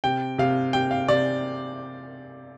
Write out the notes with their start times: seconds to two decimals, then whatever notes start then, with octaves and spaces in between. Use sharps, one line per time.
0.04 C3 G5
0.38 C3 F5
0.73 C3 G5
0.91 F5
1.08 C3 D5